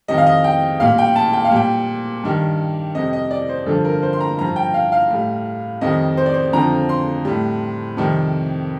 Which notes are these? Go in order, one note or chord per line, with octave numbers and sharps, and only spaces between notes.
F2 D#3 G3 D#5
F5
D#5
G5
A#2 G3 F5
G5
A5
G5
F5
A#2 G3 G5
G2 D#3 G3
F2 C3 G3 D#5
D#5
D5
C5
G2 D3 F3 A4
A#4
C5
C6
A#5
G2 F3 A#5
G5
F5
F5
A2 G3
F2 D#3 G3 D#5
C5
D5
C5
F2 D3 F3 A#5
C6
A2 G3
F2 C3 D#3 G3